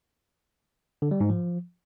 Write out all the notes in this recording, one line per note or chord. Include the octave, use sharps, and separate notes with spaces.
D3
G3
G#2
F3